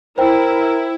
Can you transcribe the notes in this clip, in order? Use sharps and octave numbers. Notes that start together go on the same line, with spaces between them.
E4 A#4 C5 G5